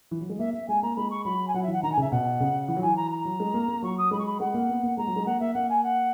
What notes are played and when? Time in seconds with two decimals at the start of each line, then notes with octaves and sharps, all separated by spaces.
0.11 E3
0.21 F#3
0.30 G#3
0.39 A#3 E5
0.53 A#3 E5
0.68 G#3 G#5
0.82 A#3 A#5
0.97 G#3 B5
1.11 C#6
1.25 F#3 B5
1.48 G#5
1.54 F#3 F#5
1.63 E3 E5
1.73 F#5
1.83 D#3 A#5
1.92 G#5
1.97 C#3 E5
2.11 B2 F#5
2.40 C#3
2.68 E3 F#5
2.77 F#3
2.82 E3 G#5
2.96 A#5
3.11 A#5
3.25 F#3
3.40 G#3
3.54 A#3
3.68 A#3
3.82 F#3 C#6
3.98 D#6
4.11 G#3 B5
4.19 C#6
4.26 B5
4.40 G#3 F#5
4.54 A#3
4.69 B3
4.83 A#3
4.97 G#3 A#5
5.07 F#3
5.16 G#3
5.26 A#3 F#5
5.40 A#3 E5
5.54 A#3 F#5
5.69 G#5
5.83 F#5